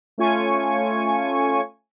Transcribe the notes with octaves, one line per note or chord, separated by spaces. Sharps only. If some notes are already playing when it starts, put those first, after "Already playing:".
A3 C#4 F4 G#5 C#6